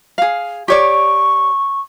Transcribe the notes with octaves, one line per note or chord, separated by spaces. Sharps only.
G#4 F5
G4 C#5 D5 C#6